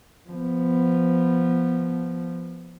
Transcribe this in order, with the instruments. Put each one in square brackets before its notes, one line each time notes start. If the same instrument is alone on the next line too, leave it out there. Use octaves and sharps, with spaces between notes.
[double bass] F3 B3